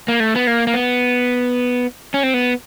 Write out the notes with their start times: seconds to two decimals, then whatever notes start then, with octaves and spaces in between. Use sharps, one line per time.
0.08 A#3
0.20 A3
0.36 B3
0.47 A#3
0.67 A#3
0.74 B3
2.14 C#4
2.23 C4
2.34 B3